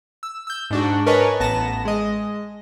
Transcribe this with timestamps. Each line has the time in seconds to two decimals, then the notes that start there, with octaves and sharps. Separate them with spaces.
0.23 E6
0.47 E6 G6
0.70 G#2 D4 F#4
1.06 A#4 B4 C#5 D#5 G#5 A5
1.40 A1 B3 A5 A#6 E7
1.85 G#3 D#5